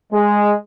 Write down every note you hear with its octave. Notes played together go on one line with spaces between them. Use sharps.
G#3